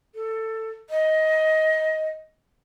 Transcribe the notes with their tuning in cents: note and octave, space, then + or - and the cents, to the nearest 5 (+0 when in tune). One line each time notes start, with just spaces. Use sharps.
A4 +15
D#5 +15